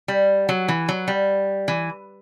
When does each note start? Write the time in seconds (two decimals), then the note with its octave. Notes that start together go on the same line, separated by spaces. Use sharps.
0.08 G3
0.49 F#3
0.68 E3
0.89 F#3
1.08 G3
1.68 E3